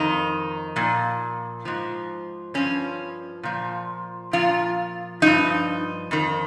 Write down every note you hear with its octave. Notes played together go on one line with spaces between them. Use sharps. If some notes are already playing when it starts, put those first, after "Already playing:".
Already playing: F2 D#3 D#4
A#2 F3
G#2 F3
G2 F3 C#4
A#2 F3
A#2 F3 F4
G2 F3 D#4
F2 D#3